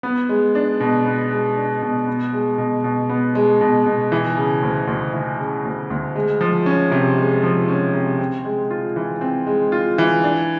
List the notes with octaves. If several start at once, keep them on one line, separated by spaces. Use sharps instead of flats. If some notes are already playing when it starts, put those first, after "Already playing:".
B3
G#3
D4
B2
B3
G#3
D4
B2
B3
G#3
B2
B2
B3
G#3
B2
B2
E3
C#3
D2
D2
E3
C#3
D2
D2
G#3
F3
C#4
C3
G#3
F3
C#4
C3
C4
G#3
F4
E3
C4
G#3
F4
E3
D4